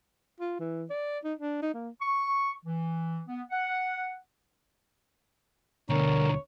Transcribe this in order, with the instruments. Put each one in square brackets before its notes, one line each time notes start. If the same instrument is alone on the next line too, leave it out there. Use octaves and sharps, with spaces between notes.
[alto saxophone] F4
E3
D5
D#4
D4
D#4
A#3
[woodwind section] C#6
E3
B3
F#5
[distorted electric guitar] D2 B2 [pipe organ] D3 A#4 [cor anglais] C#5